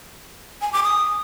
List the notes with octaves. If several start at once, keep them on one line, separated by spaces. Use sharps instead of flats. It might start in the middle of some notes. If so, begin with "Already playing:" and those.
G#5
D6
D#6